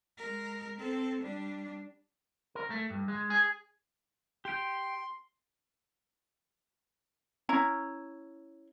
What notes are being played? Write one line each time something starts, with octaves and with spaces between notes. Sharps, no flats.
G#3 A#4
C4 A4
G3 D4
A#4
A3
G2
G#3
G#4
G4 G5 C6
C#4 E4 A#5